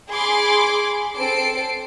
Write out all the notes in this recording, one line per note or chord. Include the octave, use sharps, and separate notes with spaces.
G#4 B5 C6 D6
C4 A4 C7 D7